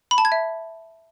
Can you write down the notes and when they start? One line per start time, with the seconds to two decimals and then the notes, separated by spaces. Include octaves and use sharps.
0.11 B5
0.18 A5
0.25 G#6
0.32 E5